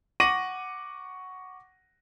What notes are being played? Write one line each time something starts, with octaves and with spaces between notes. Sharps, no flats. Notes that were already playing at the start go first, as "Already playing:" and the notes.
F#5 C#6 D6 A#6 D#7 F#7